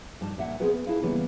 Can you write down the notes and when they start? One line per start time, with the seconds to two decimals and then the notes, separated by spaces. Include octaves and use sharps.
0.21 G2 D#4 A5
0.38 A#2 E5 F#5
0.60 B3 C4 G#4 A#4 B4
0.73 B3
0.87 E4 G#4 A4 B4 F5
1.02 C#3 E3 G3 A#3 B3